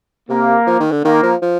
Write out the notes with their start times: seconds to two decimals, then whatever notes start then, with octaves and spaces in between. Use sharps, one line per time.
0.29 C3 A#3
0.67 F3
0.80 D#3
0.92 D3
1.05 D#3 A#3
1.23 F3
1.42 F3